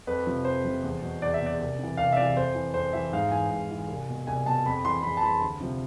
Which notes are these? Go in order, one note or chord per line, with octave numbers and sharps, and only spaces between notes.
F2 B4
C3 F3
F2 C5
C3 F3
E2
B2
E2 D5
E5
B2
D5
C2
C3 E3
C2 F5
E5
C3 E3 D5
F2 C5
E3
F2 C5
E3 E5
G#2 F5
E3 G#5
G#2
E3
C2
B2
C2 G#5
B2 A5
F2 B5
E3 C6
F2 B5
A5
E3 B5
D2
C3 F3